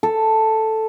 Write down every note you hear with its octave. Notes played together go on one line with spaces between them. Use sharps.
A4